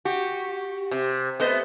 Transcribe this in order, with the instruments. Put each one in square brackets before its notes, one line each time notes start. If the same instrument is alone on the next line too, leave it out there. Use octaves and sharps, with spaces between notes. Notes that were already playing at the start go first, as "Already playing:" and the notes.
[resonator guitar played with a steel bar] F#4 [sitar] G4
[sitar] C3
[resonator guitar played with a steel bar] A3 C5 D#5 [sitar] B3